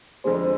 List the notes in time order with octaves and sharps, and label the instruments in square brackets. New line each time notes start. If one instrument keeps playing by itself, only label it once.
[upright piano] F2 D3 G#3 [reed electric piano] C5